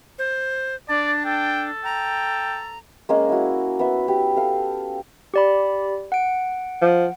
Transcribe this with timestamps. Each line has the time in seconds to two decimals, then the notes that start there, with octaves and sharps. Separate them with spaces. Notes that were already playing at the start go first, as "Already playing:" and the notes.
0.19 C5
0.89 D4 D5 A5
1.26 A4 G5
1.85 G5 A#5
3.09 G#3 A#3 C#4 F5
3.29 E4 F#4
3.79 B3 E5
4.08 G4
4.36 A4 F5
5.34 G4 D5 B5
6.12 F#5 D7
6.81 F3